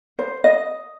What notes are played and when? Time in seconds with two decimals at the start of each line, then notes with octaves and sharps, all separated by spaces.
0.19 C5
0.44 D#5